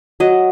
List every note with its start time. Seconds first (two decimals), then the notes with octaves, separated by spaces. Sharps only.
0.20 F#3 D#5